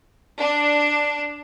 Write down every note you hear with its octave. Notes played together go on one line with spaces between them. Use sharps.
D4